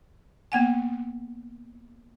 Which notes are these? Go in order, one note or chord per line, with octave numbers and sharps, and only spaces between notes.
A#3 B3 F#5 G#5